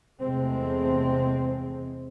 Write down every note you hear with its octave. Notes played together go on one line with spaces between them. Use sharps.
E2 C3 G#3 A3 C4